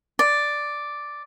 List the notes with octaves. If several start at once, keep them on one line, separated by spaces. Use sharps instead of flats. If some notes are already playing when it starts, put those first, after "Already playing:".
D5